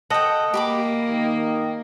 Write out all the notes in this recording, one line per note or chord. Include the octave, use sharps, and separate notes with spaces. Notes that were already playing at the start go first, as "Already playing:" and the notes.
A4 D#5 F#5 G5
A#3 G4 B5 D6
D#3